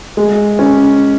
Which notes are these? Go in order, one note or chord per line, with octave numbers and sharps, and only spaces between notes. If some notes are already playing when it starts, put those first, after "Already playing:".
G#3
C#4